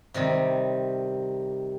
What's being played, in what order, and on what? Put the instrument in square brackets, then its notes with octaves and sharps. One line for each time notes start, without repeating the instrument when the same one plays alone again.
[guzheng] C3 D#3 G3